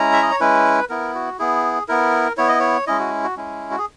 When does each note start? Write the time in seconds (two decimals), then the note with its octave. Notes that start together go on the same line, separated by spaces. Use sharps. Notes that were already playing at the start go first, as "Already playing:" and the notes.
Already playing: G#3 C#4 E4 A#5
0.13 E5
0.22 D#5
0.31 C#5
0.40 G#3 C#4 E4 B4
0.89 B3 E4 A#4
1.15 F#4
1.39 B3 E4 G#4
1.88 B3 E4 A#4
2.37 B3 E4 C#5
2.48 D#5
2.60 C#5
2.87 G#3 C#4 E4 D#5
2.99 F#4
3.24 F#4
3.37 G#3 C#4 E4
3.71 F#4
3.78 G#4